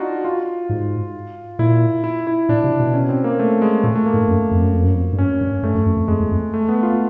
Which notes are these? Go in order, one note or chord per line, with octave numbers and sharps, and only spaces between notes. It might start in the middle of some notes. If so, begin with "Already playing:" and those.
Already playing: D4 D#4 F4 F#4
F4
G#2
A#2 E4
E4
E4
A#2 D4
C3
B2
C#4
C4
A#3
A3
G#3
A#2 A3
A3
A#3
G#2
F#2
F2
F#2
F2
F#2
F2
G2
F#2 C#4
G2
G2 A3
F#2
F#2
F2
F2 G#3
E2
F2
A3
B3
F4